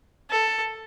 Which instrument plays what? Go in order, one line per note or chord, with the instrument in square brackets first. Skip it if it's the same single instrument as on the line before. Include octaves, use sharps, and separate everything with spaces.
[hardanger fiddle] A4